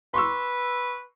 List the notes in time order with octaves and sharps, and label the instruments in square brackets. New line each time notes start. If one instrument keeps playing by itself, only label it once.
[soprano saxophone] B4 [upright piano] C6 C#6 E6